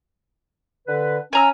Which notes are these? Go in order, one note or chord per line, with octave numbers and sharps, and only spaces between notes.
D3 B4
C#4 G#5 A#5 E6